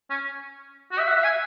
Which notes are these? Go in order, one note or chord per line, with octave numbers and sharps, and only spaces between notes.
C#4
F#4
E5
F#5
E5
G#5